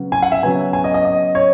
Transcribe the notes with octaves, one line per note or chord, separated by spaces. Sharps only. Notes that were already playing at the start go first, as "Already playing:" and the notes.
Already playing: C#3 F#3 B3
G#5
F#5
E5
C#3 F#3 B3 G#5
G#5
D#5
D#5
D#5
C#5